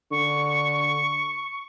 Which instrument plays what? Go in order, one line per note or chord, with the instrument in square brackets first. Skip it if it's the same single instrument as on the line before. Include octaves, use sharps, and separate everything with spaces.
[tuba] D3 [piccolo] C#6